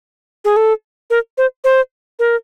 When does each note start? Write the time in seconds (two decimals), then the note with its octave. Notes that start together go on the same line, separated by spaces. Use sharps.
0.45 G#4
0.56 A4
1.10 A#4
1.38 C5
1.64 C5
2.19 A#4